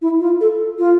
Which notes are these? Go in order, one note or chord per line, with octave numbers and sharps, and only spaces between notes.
E4
F4
A4
F4